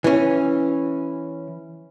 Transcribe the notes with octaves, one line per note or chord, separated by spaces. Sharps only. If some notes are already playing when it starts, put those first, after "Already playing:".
E3 C#4